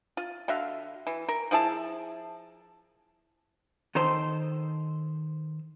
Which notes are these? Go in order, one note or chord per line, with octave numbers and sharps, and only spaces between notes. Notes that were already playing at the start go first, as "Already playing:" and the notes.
F4
D3 F#4 E5 F5
E3
A#4
F3 E4 G#4 A5
D#3 D#4 A4 C5